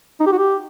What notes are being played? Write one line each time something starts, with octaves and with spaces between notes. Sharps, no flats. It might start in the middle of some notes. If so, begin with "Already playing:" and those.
D#4
G4
F#4
G4